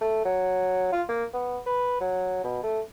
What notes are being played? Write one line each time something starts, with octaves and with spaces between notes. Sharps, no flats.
A3
F#3
F4
A#3
B3
B4
F#3
B2
A3